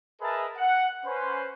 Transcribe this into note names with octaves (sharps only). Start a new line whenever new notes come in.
G#4 A#4 B4 D#5 E5 A5
F#5
C#4 B4 C5